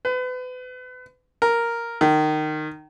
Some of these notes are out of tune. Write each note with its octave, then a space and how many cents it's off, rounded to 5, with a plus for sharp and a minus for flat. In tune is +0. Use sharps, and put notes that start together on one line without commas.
B4 +35
A#4 +0
D#3 -20